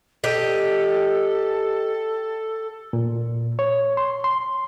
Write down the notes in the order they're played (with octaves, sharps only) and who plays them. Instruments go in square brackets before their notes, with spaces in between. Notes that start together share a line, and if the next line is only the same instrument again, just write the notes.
[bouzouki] G4 D#5 [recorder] A4
[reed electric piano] A#2
C#5
C6
C6